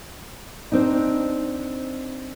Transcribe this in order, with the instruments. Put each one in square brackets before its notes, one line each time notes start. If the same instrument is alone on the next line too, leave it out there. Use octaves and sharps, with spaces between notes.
[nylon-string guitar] C4 D4 D#4